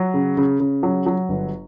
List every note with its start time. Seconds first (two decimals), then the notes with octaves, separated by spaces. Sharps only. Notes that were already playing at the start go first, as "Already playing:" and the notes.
Already playing: F#3
0.14 C#3
0.37 C#3
0.60 C#3
0.83 F#3
1.06 F#3
1.29 G1